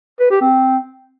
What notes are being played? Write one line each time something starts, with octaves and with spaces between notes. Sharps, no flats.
B4
G4
C4